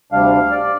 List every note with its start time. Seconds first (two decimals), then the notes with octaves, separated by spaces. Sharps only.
0.12 D2 C3 G3 D4 F5
0.51 D5